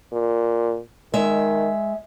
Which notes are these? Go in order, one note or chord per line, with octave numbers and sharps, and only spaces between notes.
A#2
D#3 G#3 E5